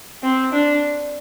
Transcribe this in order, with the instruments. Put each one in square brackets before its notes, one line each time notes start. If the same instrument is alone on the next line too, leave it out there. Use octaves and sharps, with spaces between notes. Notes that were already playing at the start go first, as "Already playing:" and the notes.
[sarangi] C4
D4